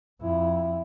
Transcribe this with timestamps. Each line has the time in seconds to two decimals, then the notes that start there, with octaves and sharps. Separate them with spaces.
0.21 F2 E4